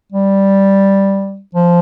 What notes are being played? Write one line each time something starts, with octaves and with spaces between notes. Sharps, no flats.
G3
F3